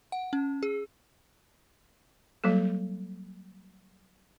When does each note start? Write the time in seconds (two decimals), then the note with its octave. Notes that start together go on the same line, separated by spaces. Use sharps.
0.12 F#5
0.33 C#4
0.63 G#4
2.44 F#3 G3 A#3 A4